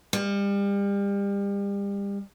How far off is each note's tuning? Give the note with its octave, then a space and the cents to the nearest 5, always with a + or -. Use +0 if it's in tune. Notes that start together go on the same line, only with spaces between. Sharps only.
G3 +35